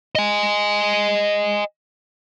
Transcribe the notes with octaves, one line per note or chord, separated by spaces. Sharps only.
D#5 G#5